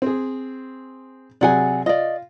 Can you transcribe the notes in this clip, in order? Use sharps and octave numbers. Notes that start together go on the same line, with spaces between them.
C4 G#4
C3 F#3 G#4 D5 F#5 G#5
F4 D5 D#5